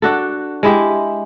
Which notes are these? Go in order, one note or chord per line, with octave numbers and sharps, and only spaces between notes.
D4 F#4 A4
G#3 E4 G4